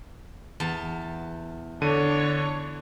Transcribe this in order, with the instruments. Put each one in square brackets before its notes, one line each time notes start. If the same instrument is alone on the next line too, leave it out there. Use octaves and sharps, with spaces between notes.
[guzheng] E2 A5
[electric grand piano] D3 D#7 [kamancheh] D4 C#5